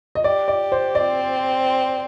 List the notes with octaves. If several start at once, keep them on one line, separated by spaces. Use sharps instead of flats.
D#5
G4 D5
D5
C5
C4 D5